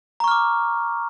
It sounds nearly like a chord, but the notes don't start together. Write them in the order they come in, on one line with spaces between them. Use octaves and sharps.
A#5 C#6 F6 D6